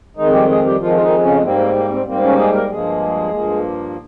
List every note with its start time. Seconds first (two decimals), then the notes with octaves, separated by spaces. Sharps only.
0.16 F2 D#3 G#3 D#4
0.27 G#4
0.32 G3 G4
0.48 G#3 G#4
0.65 G3 G4
0.80 F2 D#3 F3 G#3 F4
0.94 F4
1.01 D#3 D#4
1.23 C#3 C#4
1.43 G#2 G3 A#3 C4
1.59 C4
1.75 A#3
1.90 C4
2.06 G#2 G3 A#3 C4
2.23 C#3 C#4
2.38 G#3 G#4
2.54 A#3 A#4
2.70 G2 F3 G#3 A#3 G#4
3.33 G2 F3 A#3